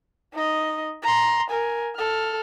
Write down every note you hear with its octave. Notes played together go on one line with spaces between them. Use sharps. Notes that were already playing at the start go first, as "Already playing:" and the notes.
D#4 D#5
A#5 C6
A#4 G#5
A4 F6